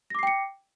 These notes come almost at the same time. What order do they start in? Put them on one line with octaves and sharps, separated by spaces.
A#6 D6 C7 G5 C#7